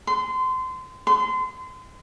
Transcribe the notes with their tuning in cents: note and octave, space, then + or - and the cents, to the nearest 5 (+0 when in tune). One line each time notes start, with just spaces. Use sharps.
C6 -25
C6 -35